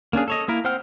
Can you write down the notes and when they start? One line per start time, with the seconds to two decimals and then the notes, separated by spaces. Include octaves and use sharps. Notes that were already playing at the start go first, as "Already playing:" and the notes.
0.13 A#3 C#4 D4 G#4
0.28 A4 C#5 D#5
0.48 A#3 E4 A#4
0.64 C4 C5 F#5 G5 F6